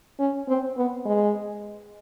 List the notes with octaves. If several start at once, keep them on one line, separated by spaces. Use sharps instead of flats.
C#4
C4
B3
G#3